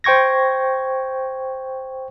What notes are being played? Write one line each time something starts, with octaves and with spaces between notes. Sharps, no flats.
C5 G5 C#6 G#6 A#6